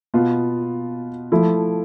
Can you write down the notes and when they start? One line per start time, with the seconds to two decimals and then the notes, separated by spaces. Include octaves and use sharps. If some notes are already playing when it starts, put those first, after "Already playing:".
0.14 B2 B3 F4
1.32 F3 A3 E4